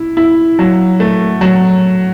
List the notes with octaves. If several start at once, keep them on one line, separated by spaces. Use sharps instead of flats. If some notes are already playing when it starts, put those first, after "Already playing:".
Already playing: E4
E4
F#3
A3
F#3